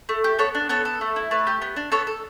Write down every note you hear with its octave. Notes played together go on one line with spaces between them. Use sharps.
A3
G4
B3 A4 C#5
D4
B3 A4 C#5
A4
A3
E4
A3 B4
G4
B3
D4
B3 A4 C#5
A4